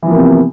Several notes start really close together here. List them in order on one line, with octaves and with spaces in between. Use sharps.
E3 F3 A#3 C3 B3